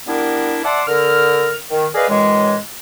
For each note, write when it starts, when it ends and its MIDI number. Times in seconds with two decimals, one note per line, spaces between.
0.07 0.59 55
0.07 0.59 59
0.07 0.59 62
0.07 0.59 64
0.07 0.59 70
0.64 0.82 74
0.64 0.82 76
0.64 0.82 78
0.64 0.82 81
0.64 0.82 84
0.64 0.82 86
0.87 1.54 50
0.87 1.54 70
0.87 1.54 89
1.70 1.86 51
1.95 2.08 68
1.95 2.08 70
1.95 2.08 71
1.95 2.08 74
1.95 2.08 75
1.95 2.08 77
2.09 2.55 42
2.09 2.55 45
2.09 2.55 52
2.09 2.55 56